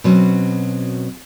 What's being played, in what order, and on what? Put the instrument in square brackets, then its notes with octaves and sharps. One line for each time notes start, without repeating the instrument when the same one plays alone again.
[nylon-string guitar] B2 F#3 C4 C#4